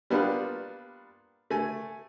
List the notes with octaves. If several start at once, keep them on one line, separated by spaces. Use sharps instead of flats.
G3 A#3 B3 D4 F4
A3 G#5